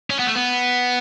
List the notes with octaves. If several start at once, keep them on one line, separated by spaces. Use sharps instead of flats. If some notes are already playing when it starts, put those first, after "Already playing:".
C#4
B3
A3
B3